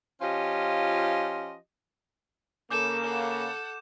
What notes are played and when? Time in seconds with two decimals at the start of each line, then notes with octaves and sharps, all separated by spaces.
0.22 F3 C#4 F4 G4 D#5
2.70 C#3 A#3 A4 D6 G6 E7
3.04 A4 F#5